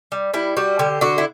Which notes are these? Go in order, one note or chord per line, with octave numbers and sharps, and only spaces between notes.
G3
G3 E4
G3 F#4
D3 G4
D3 F#4
E4